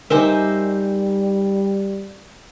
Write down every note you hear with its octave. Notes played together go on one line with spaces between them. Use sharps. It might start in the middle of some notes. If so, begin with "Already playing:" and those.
G3 D#4 A#4 C5 E5 G#5 D6